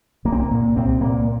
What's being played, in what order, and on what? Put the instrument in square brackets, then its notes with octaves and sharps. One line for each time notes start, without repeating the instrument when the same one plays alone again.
[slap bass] C2 A#3
C4
A#3
A#2
C2 C4
A#2 A#3